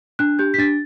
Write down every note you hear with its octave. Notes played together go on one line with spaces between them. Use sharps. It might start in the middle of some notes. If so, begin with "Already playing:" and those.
D4 F#6
G4 G6
B6
D4 A6